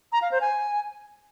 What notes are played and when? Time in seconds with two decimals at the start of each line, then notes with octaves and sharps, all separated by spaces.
0.12 A#5
0.22 F5
0.31 C5
0.41 G#5